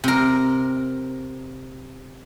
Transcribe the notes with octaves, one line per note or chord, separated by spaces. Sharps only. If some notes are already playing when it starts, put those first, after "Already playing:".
C3 A#4